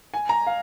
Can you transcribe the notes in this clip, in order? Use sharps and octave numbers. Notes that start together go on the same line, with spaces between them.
G#5
A#5
F5